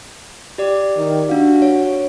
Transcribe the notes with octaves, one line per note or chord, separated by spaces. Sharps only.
G4 D5
D#3
D4 F#4 F5
C#5